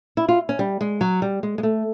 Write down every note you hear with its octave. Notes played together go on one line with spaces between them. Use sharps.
E4
F4
C#4
G3
G#3
F#3
G3
G#3
G#3
A3